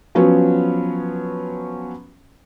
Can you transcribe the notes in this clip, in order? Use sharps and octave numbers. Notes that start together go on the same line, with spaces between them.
F3 F#3 B3 C#4